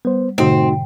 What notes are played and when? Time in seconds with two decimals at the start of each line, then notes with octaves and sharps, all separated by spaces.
0.05 G3 B3 C5
0.38 G#2 B2 D3 A3 C4 D#4 F#4